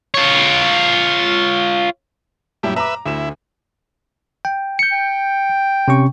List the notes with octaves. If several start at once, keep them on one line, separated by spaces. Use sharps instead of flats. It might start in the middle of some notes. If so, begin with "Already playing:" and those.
F4 C#5
F#2 A#2 G3 E4
B4 E5 A#5 D6
D2 E4 E7
G5
G6 C#7
G5
C3 C#4 C#6